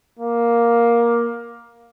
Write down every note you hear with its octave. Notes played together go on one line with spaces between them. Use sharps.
A#3